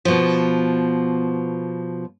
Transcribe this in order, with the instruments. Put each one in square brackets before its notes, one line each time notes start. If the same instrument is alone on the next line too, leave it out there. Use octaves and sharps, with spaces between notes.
[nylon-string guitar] B2 F3